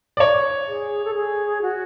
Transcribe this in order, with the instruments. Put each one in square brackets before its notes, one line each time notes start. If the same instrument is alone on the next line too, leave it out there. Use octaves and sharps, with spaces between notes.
[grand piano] D5
C#5
[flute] G#4
A4
G#4
F#4